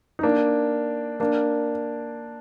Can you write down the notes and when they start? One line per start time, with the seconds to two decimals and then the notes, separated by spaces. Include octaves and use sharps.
0.19 D#4
0.23 A#3 D4
1.20 A#3 D4